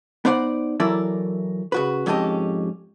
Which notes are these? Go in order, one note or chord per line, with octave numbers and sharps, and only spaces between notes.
B3 D#4 C5 D5 F5 F#5
E3 F#3 E4 A4 A#4 D5
C#3 F#4 B4
F2 G#2 C#4 G4 A4 D#5